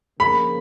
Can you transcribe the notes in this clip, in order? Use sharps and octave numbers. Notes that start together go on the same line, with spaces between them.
C#3 F3 A#3 B5